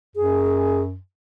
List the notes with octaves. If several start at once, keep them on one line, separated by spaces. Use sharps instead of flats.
F#2 G#4